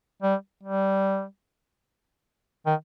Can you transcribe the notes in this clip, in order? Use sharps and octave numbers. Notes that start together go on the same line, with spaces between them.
G3
G3
D#3